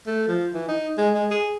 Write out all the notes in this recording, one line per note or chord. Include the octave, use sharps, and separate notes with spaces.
A3
F3
E3
D#4
G#3
G#3
G#4